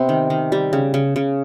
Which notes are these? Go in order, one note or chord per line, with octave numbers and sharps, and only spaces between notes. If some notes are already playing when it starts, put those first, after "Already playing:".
Already playing: C3 B3 C4 C5
D#3
D#3
G3
C#3
C#3
C#3